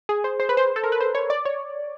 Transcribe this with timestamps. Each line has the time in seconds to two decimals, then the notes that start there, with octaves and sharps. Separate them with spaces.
0.09 G#4
0.24 C5
0.40 C5
0.49 B4
0.57 C5
0.76 A4
0.83 A#4
0.92 B4
1.00 C5
1.15 C#5
1.30 D5
1.45 C#5